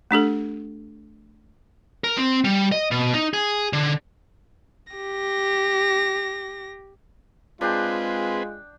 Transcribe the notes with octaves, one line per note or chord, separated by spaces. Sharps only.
A3 D4 G4 A4
A#4
C4
G3
D#5
B2
D#4
G#4
D3
G4 A#6
G#3 C4 D4 F4 G#4 B4 G5